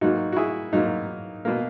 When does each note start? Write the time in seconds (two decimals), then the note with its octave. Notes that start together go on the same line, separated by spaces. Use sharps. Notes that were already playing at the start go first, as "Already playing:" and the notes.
0.01 G#2 F#3 A#3 D#4 F#4
0.32 F#4
0.36 E4 G#4
0.73 G#2 F#3 A#3 D#4
1.45 B2 A#3